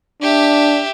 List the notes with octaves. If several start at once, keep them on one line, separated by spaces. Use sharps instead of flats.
D4 G4 E5